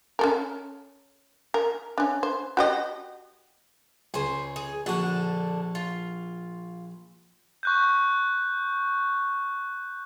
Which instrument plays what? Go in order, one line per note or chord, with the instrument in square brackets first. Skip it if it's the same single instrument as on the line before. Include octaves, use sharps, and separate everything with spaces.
[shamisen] C#4 A4 A#4
A#4
C#4 D4
C5
F#4 G4 D#5
[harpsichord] C#2 [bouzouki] C5 G#5
[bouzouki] G#4
[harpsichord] A#1 F#4 A5 [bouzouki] D3 D4
[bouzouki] F4
[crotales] C#6 F#6 G6